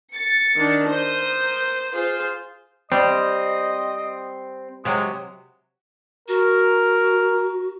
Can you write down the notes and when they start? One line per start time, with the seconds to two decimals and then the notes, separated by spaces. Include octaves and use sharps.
0.13 A6 C#7
0.57 D#3 D4
0.89 A#4 C5 D#6 G6
1.94 F4 G#4 C5
2.92 G3 C4 D#5
4.85 C3 F#3 G#3
6.28 F#4 A#4